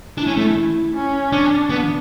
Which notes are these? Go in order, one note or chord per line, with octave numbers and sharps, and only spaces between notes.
D4 E4
C#4
A3
C#4
C#4 D4
B3